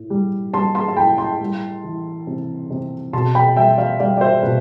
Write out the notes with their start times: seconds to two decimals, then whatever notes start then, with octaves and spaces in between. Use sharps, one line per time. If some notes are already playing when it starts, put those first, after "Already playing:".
Already playing: A2
0.10 G3
0.53 G3 A5 C6
0.75 A5 C6
0.88 A5
0.96 A2 G5 B5
1.18 A5 C6
1.41 G3
1.84 E3
2.27 C3
2.71 C3
3.13 B2 A5 C6
3.35 G5 B5
3.56 G3 E5 G5
3.78 D5 F5
4.00 G3 D5 F5
4.17 D5
4.21 C5 E5
4.43 B2 B4